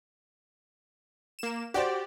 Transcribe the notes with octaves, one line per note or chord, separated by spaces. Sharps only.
A#3 E7
F#4 G4 C5 D5